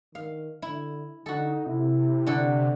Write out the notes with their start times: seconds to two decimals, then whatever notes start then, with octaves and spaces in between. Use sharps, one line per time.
0.15 D#3 F5
0.62 D3 E4
1.26 D3 D#4 F#4 A4
1.67 C3 E4
2.27 D3 F#4 A4